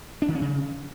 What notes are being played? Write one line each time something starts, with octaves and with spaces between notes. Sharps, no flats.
D4
D#3
C#4
C#3